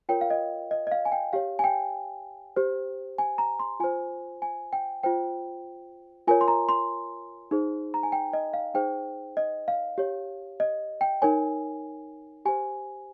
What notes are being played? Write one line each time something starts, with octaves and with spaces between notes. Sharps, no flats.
F4 A#4 C#5 G5
F5
D#5
D#5
D#5
F5
G#5
G5
G4 C#5 F5
G#5
G5
G4 C5
G#5
A#5
C6
F4 C5 G#5
G#5
G5
F4 C5 G5
F4 A#4 C#5 G#5
C6
A#5
C6
D#4 G#4 C5
A#5
G#5
G5
D#5
F5
D#4 G#4 C5 G5
D#5
F5
G4 C#5
D#5
G5
D#4 A#4 C#5 G#5
G4 C5 G#5